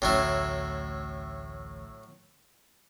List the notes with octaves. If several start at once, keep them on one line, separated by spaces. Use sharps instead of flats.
A1 D2 A2 F#3 E4